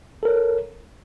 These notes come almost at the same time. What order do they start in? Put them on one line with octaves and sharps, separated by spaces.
A4 A#4 C#5